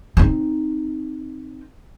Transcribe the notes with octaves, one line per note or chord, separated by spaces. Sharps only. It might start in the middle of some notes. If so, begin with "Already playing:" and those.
C4 D#4